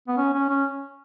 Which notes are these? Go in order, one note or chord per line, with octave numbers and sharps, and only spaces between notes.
B3
C#4
C#4
C#4